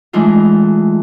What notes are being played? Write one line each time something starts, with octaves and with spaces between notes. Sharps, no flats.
E3 G#3 A3 D4 D#4 F4